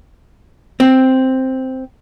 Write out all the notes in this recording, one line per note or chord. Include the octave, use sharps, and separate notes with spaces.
C4